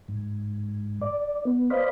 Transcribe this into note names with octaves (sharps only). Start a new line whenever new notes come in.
G#2
D5
B3
B4 C5 D5 D#5 F5 B5